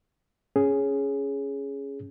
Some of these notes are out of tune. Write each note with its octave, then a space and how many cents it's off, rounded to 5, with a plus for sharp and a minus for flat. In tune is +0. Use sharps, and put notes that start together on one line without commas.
C#4 +0 G#4 +0